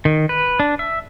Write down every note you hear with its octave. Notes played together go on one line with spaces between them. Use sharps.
D#3
B4
D4
E5